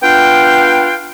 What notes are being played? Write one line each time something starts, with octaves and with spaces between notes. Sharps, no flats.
B3 D4 F4 F5 G5